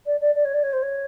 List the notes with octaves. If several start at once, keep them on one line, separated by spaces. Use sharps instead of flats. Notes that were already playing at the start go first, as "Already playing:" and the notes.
D5
D5
D5
C#5
D5
C#5
C5
C#5